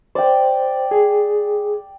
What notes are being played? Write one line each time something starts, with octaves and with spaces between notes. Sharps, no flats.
C5 D5 G5
G#4